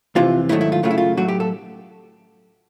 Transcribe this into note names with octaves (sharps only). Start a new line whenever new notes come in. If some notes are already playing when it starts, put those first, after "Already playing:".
F2 C3 E3 F4
G#2 D#3 F#3 A3 E4
E4
F4
F#2 C#3 F#3 A3 F4
E4
F4
A2 F#3 A3 F#4
G4
A4